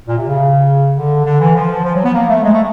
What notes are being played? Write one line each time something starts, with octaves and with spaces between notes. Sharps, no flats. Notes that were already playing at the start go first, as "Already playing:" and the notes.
A#2
C3
C#3
D3
D3
E3
F3
F3
F#3
B3
A#3
A3
G#3
A3